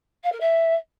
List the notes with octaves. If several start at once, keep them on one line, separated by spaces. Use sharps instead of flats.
F5
A#4
E5